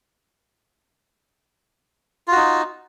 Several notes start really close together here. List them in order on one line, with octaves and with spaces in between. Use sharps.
F4 F#4 D#4